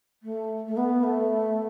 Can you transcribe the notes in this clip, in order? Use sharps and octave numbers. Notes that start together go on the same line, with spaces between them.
A3
A3
B3
A3